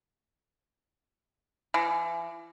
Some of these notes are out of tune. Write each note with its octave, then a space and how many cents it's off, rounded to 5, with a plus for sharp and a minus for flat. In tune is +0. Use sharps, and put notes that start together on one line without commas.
E3 +35